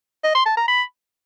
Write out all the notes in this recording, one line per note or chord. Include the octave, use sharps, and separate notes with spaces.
D#5
C6
A5
A#5
B5